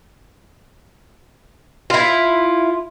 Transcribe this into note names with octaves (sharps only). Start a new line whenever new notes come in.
E4 F4